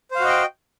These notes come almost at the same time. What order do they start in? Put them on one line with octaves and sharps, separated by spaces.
C5 F5 F#4 D#5 G5